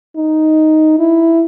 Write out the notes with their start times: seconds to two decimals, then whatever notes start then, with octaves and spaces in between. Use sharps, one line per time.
0.17 D#4
0.99 E4